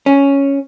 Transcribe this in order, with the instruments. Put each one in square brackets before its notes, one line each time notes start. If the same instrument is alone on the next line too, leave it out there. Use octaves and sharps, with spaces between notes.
[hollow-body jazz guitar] C#4